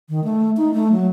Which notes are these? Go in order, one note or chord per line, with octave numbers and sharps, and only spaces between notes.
D#3
A3
D#4
A3
F#3